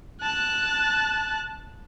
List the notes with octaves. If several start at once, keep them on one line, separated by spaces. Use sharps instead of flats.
A5 F#6